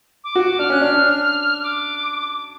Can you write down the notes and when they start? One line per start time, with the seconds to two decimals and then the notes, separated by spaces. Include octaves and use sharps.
0.24 D6
0.35 F#4
0.59 D4 F6
0.70 C#4 F#6
0.81 D4 F6
0.94 D4
1.64 D6